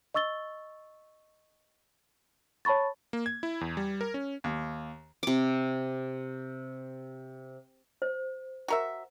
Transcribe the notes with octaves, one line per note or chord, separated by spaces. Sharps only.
D#5 C#6 E6 A6 G7
C#5 A5 B5 C#6 A6
A#3
G#6
E4
E2
G3
A#4
C#4
D#2
C3 D6
C5
F#4 A#4 E5